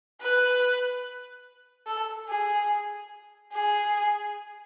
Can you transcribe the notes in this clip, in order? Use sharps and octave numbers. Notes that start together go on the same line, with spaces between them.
B4
A4
G#4
G#4